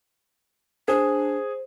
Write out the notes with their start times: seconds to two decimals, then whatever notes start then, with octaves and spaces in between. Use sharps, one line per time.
0.88 D4 G#4 C5